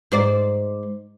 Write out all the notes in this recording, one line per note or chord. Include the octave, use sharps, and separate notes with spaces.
G#2 C5 D5